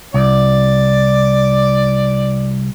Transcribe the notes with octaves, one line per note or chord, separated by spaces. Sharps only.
C2 D5